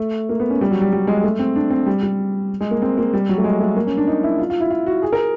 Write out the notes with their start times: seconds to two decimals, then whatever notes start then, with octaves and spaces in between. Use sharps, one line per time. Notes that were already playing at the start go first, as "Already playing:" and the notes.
Already playing: A3
0.29 A#3
0.40 B3
0.50 C#4
0.61 G3
0.71 F#3
0.82 G3
0.93 G3
1.07 G#3
1.24 A3
1.39 C4
1.56 D4
1.70 C4
1.87 G3
2.03 G3
2.61 G#3
2.71 A#3
2.82 C4
2.98 A#3
3.14 G3
3.29 F#3
3.38 A3
3.44 G#3
3.60 A3
3.76 A#3
3.87 C#4
3.97 D4
4.07 D#4
4.23 E4
4.39 F4
4.50 F4
4.60 E4
4.70 F4
4.86 F#4
5.02 G#4
5.13 A#4